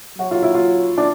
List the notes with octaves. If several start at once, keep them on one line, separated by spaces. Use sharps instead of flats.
F#3 F#4
F4
E4
F4
D4